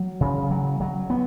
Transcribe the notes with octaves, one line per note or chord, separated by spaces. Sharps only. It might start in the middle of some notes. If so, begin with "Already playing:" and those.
Already playing: F#3
C#3
F#3
F#3
B3